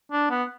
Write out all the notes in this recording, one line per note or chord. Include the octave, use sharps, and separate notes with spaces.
D4
B3